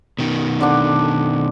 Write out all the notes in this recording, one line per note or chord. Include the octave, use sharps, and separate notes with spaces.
B2 D#3
D3 D4